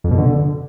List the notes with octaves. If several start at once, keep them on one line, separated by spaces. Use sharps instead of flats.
F2
B2
D3